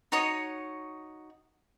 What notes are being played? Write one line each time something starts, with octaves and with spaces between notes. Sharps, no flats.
D#4 F#4 C#5 D#5